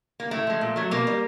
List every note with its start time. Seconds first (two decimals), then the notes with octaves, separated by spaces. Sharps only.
0.20 A#3
0.31 A2 A3
0.47 F3 G#3
0.61 A#2
0.76 F#3 A3
0.91 B2 A#3
1.07 G3